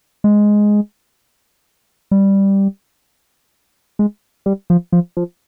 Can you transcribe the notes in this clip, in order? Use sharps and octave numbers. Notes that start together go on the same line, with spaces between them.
G#3
G3
G#3
G3
F3
F3
F3